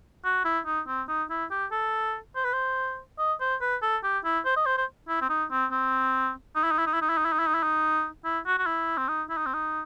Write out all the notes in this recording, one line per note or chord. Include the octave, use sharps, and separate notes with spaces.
F#4
E4
D#4
C4
D#4
E4
G4
A4
C5
B4
C5
D#5
C5
B4
A4
G4
E4
C5
D#5
C5
C5
E4
C4
D#4
C4
C4
D#4
E4
D#4
E4
D#4
E4
D#4
E4
D#4
E4
D#4
E4
D#4
E4
D#4
E4
F#4
F#4
E4
C4
D#4
E4
D#4
C4
D#4